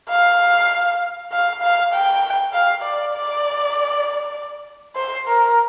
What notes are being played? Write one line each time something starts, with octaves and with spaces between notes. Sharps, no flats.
F5
F5
F5
G5
F5
D5
D5
C5
A#4